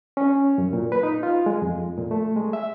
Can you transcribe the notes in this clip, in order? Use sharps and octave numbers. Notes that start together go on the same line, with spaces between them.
C#4
F#2
A#2
B4
D#4
F4
G#3
F2
A#2
A3
G#3
E5